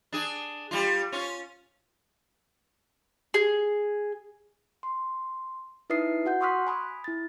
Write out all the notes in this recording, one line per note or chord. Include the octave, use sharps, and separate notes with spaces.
D4 G#4
G3 F4
C#4 F4
G#4
C6
D#4 E4 B4 E5 D#6 C7
F#4 F#5 G6
C6 C#6 D#6 F6 F#6 B6
G#5 B5 D#6
E4 A6